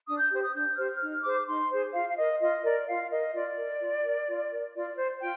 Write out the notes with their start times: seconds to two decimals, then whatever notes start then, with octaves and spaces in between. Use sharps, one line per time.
0.07 D4 D#6
0.19 G6
0.31 G4 C5
0.42 D#6
0.53 D4 G6
0.77 G4 C5 F6
1.00 D#4 F6
1.23 G#4 C5 D6
1.47 D#4 C6
1.71 G#4 C5
1.93 F4 F5
2.10 F5
2.17 A#4 D#5
2.41 F4 D#5
2.64 A#4 D5
2.87 F4 F5
3.10 A#4 D#5
3.34 F4 D5
3.57 A#4
3.81 F4
4.04 A#4
4.28 F4
4.51 A#4
4.74 F4 D5
4.97 C5
5.21 F4 G5